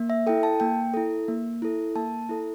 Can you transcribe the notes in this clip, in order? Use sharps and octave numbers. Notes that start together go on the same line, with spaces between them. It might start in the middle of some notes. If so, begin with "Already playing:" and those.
Already playing: A#3
E5
E4 A4 G5
A5
A#3 G5
E4 A4
A#3
E4 A4
A#3 A5
E4 A4